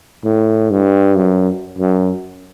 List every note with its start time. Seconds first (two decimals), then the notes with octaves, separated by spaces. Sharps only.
0.24 A2
0.71 G2
1.17 F#2
1.78 F#2